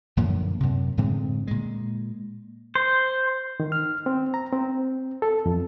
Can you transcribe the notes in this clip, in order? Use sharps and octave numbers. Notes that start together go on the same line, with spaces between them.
F#2 A#2 D3 F3
F#2 C3
A2 D3 G#3 C4
A#2 G#3
C5
D#3
F6
C4
A#5
C4
A4
F2